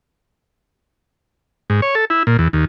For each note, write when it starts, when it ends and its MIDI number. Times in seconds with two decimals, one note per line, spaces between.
1.70 1.81 44
1.82 1.95 73
1.95 2.05 69
2.10 2.23 64
2.27 2.37 46
2.39 2.48 40
2.53 2.65 39